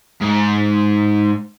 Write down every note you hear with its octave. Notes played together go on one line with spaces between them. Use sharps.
G#2